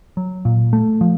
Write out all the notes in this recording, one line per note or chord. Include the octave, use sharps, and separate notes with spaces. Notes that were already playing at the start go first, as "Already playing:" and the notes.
F#3
A#2
A3
F3